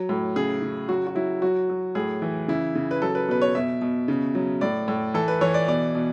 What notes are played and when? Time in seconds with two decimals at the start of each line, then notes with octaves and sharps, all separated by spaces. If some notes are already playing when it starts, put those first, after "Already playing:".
Already playing: F#3
0.09 A2
0.36 C#3 G#4
0.62 C#3
0.88 F#3 F#4
1.07 F#4
1.15 F#3 E4
1.42 F#3 F#4
1.69 F#3
1.95 A2 G#4
2.22 E3
2.48 C#3 E4
2.75 C#3
2.91 B4
3.02 F#3 A4
3.15 B4
3.28 B2 B4
3.42 C#5
3.55 B2 E5
3.81 B2
4.08 C#3
4.35 F#3
4.61 A2 D5
4.88 A2
5.14 E3 A4
5.28 B4
5.41 E3 C#5
5.54 D5
5.68 B2 D5
5.95 B2